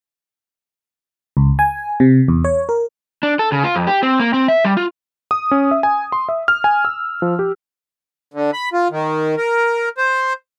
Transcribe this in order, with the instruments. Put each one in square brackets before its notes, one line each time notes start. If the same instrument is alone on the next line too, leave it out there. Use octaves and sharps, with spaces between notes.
[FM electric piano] C#2
G#5
C3
E2
C#5
A#4
[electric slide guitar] D4
A4
C#3
F4
F2
G4
C4
A#3
C4
E5
G3
F4
[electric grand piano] D#6
C#4
E5
G#5
C6
E5
F6
G#5
E6
F3
G4
[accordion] D3
B5
F4
D#3
A#4
C5